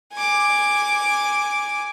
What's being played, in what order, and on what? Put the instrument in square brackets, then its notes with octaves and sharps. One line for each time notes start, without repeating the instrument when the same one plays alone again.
[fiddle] G#5 D6